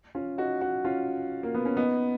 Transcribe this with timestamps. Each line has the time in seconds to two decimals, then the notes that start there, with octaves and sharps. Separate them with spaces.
0.15 C#4 F4
0.38 D#4 F#4
0.61 D#4 F#4
0.84 C#4 F4
1.43 A#3
1.54 B3
1.65 C#4
1.77 B3 D#4